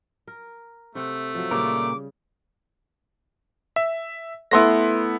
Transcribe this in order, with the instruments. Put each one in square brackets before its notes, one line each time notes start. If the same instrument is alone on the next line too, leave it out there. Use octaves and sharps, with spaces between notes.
[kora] A#4
[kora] C3 G4 F#5 [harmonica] A3
[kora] F3 F#3
[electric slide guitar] A#2 A#4 [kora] C#3 G3 [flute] D6
[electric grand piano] E5
[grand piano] A3 B3 E4 [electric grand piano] B4 C6 A#6